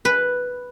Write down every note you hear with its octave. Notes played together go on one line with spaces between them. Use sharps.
B4